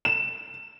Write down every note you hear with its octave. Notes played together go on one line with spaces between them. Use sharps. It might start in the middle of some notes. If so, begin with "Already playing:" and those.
E7